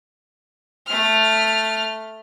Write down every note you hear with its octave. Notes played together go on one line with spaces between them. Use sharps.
A3 F6